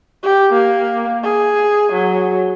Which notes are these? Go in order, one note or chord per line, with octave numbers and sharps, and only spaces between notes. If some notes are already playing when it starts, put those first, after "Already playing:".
G4
A#3
G#4
F#3